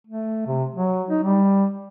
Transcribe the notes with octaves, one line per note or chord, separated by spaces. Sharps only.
A3
C3
F#3
D#4
G3